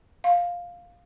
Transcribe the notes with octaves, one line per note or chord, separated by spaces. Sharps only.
F5